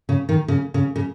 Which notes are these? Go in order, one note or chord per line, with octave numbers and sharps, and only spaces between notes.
C#3
D#3
C#3
C#3
C#3